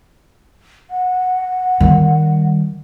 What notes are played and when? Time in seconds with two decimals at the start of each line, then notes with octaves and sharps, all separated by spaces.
0.90 F#5
1.80 D#3 G3